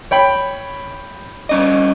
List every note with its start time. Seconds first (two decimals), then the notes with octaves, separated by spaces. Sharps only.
0.11 C#5 G5 B5
1.49 G3 C#4 D#5